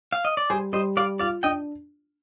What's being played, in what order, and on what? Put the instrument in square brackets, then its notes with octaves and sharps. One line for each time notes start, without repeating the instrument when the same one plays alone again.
[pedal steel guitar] F5
D#5
D5
[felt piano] G3 [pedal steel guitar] G#4 C5
[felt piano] G3 [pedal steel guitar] C5 D#5
[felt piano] G3 [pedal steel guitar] D5 F5
[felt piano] F4 [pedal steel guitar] D5 F5
[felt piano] D4 [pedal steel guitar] D#5 G5